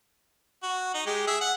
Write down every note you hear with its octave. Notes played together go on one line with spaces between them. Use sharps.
F#4
D#4
G#3 G4
G#4 E5
F#5